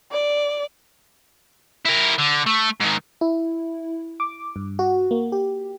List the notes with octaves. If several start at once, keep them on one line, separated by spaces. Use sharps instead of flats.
D5
E4 A#4
D3
A3
G#2 D#3
E4
D6
G2
F#4
A#3
G4